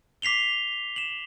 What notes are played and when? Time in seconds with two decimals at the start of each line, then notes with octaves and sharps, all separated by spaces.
0.22 D6 B6 C7 F7 G7
0.96 E7 F#7